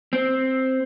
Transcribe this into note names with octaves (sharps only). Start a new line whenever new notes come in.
C4